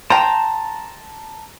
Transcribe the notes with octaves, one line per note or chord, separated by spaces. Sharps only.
C5 G5 A5 A#5